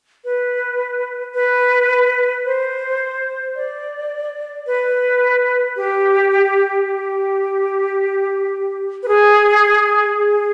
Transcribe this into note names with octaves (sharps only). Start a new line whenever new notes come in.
B4
B4
C5
D5
B4
G4
G4
B4
G#4
G#4